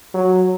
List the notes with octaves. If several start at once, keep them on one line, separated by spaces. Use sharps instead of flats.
F#3